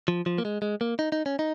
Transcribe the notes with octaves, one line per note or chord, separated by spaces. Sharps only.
F3
F3
A#3
G#3
G#3
A#3
D#4
D#4
C#4
D#4